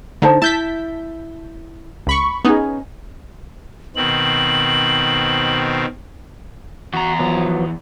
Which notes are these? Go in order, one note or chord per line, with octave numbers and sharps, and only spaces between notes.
D3 D#4 C5 A5
E4 A5 G6 B6
C#2 B5 C#6
B3 C#4 D#4 G#4
B2 D#3 C4 F#7
E2 F#4 A#5
F3 F#3 B3